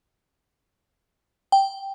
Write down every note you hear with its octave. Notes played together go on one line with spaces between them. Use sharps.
G5